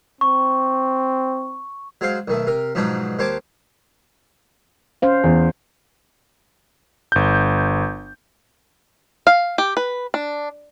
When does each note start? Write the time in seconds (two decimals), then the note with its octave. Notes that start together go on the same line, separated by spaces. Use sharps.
0.21 C4 C#6
2.01 F#3 G#3 C5 F5
2.28 B1 D#3 A3
2.47 C3 A#4
2.75 G#2 B2 F3 F#3 D4 D#4
3.19 D#2 C5 C#5 A5 D6
5.02 C#4 C5 F5
5.24 E2
7.12 G1 G6
9.27 F5
9.58 G4
9.77 B4
10.14 D4